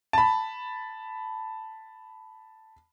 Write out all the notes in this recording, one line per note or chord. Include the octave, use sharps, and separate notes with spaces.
A5 B5